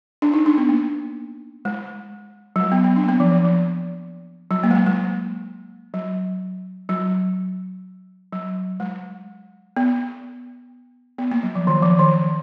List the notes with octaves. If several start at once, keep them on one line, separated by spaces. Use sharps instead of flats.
D4
D#4
D4
B3
A#3
G#3
F#3
G#3
B3
B3
D4
A#3
B3
F3
F3
F3
F#3
A#3
G#3
A#3
G#3
F#3
F#3
F#3
G#3
B3
B3
A#3
F#3
F3
D#3
F3
D#3